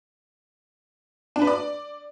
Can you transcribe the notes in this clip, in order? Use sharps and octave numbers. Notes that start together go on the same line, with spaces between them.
D4
B4
D5